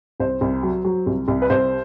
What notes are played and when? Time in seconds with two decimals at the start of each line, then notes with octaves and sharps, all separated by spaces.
0.20 C2 C5
0.41 C2
0.63 F#3
0.85 F#3
1.06 C2
1.28 C2
1.42 B4
1.50 C2 C5